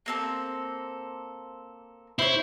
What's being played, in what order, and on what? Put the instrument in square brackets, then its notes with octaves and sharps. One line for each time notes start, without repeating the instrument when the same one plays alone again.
[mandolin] A#3 C4 A4
[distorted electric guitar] E4 [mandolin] C5 C#5